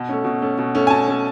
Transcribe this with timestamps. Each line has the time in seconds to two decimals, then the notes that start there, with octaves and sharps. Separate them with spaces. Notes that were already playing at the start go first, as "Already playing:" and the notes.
Already playing: B2
0.09 A3 C#4
0.25 B2
0.42 A3 C#4
0.59 B2
0.75 A3 C#4
0.87 G#5
0.90 B2 A5
1.08 A3 C#4